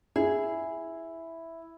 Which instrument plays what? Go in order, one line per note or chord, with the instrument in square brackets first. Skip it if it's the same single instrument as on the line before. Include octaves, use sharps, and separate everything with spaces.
[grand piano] E4 [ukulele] G#4